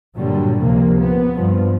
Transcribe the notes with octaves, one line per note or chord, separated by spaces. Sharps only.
G2 A#2 D3 F#3 G3
C#2 C3 F3 A#3
B3
G2 F3